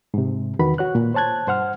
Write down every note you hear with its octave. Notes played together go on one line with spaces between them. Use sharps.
G#2 C3
E2 D#3 F#4 B4 B5
F#4 C#5 F#6
A#2
C5 C#5 A5 F#6 G#6
G2 C5 F#5 F6